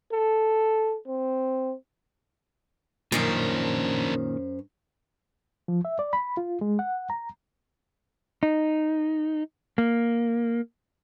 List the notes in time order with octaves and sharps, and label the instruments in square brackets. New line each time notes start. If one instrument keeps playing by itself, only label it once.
[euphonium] A4
C4
[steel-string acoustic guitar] F#2 C#4 C5 [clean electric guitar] A#2 D#3 [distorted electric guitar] D4 A#4
[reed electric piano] F3
E5
D5
B5
F4
G#3
F#5
A#5
[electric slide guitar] D#4
A#3